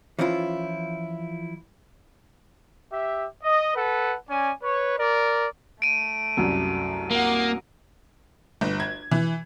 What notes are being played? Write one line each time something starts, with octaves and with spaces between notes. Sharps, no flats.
E3 F3 C#4 E4 F4
G4 E5
D#5
A4 B4 F#5
C#4 D5 G#5
B4 C#5
A#4 D5
A3 D7 D#7
C2 F#2 F#3
A#3 F#5 D#6
G1
G#6
E3